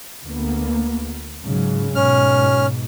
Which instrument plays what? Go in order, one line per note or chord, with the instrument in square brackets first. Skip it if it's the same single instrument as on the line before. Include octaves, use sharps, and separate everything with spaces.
[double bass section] D2 A#3 B3
G#2 C#3 F#3
[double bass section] G#2 B2 [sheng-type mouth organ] C#4 F6